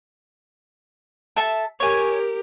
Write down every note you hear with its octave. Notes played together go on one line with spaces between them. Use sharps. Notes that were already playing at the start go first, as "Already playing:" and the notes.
A4 E5 A5
G4 A#4 C#5 G#5